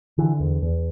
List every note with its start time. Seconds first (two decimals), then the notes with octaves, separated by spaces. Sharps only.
0.18 D3 E3
0.40 E2
0.62 E2